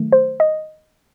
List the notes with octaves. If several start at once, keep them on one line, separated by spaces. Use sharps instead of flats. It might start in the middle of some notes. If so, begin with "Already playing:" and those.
Already playing: D#3 F#3 A3
C5
D#5